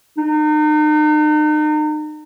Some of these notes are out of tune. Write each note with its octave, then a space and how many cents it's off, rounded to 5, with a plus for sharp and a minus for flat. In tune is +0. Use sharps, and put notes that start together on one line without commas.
D#4 -40